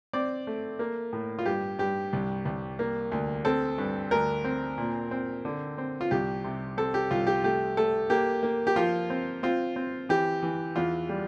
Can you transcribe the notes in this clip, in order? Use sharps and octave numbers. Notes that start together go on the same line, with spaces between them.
C4 D5
A3
A#3
A2
F4
G2 G4
G2 G4
C2
C2
A#3
D2
C4 A4
G2
D2 A#4
C4
A#2
C4
D3
C4
F4
C2 G4
C3
C4 A4
G4
C2 F4
G4
A3 G4
A3 A4
A#3 G4
A#3
G4
F3 F4
C4
C4 F4
C4
E3 G4
E3
E2 F4
G3